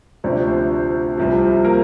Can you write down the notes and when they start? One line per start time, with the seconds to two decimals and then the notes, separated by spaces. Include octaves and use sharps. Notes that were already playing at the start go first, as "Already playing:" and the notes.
0.24 D2 C3 F3 D4 D5
0.48 C4 C5
1.17 C2 C3 F3
1.65 A#3 A#4